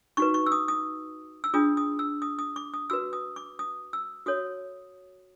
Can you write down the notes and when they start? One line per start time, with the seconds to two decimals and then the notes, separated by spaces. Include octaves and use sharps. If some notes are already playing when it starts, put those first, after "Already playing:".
0.17 D#4 F#4 B4 C#6
0.34 C#6
0.47 E6
0.52 D#6
0.68 D#6
1.44 E6
1.54 D4 F4 G#4 D#6
1.77 D#6
1.99 E6
2.22 D#6
2.39 D#6
2.56 D6
2.74 D#6
2.90 F#4 B4 E6
3.13 D#6
3.36 D6
3.59 D#6
3.93 E6
4.26 F#4 A4 C#5 D#6